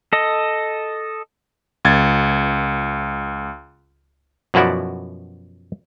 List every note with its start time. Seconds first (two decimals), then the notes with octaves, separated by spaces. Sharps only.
0.13 A4 D#5
1.85 C#2 G#6 A6
4.54 F#2 B2 F3 E4 F#4 D5